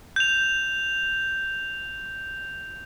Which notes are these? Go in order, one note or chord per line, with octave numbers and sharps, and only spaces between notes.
G6 F7